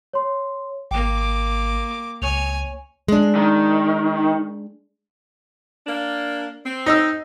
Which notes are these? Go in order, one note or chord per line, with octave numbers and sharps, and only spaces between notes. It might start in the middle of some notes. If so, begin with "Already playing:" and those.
C#5 C6
G#1 A#3 G5 D6
C#2 C#5 G#5 F7
G#3 D4
D#3
A#3 D4
C4
D#4 D#5 E6